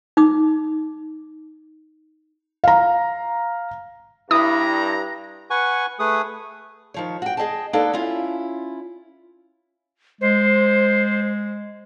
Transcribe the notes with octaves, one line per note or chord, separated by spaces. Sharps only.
D#4 D6 D#6
F5 A#5
G2 E4 A#5 B5 D#6
B4 F#5 G#5 C#6
A3 G#4 B4 D#6
D#3 F3 C#5
F#4 G5
G#4 D#5 G5 A5
A#3 D4 D#4 A4 B4 G5
C#4 E4 F4
G#3 C5